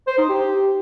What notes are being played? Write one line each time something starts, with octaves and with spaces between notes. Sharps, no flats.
C5
D#4
G4